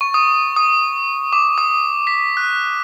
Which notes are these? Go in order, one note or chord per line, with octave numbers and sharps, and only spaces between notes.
C#6
D#6
D#6
D6
D#6
B6
F#6